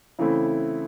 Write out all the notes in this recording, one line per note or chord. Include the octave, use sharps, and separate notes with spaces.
C#3 E3 A3 C4 E4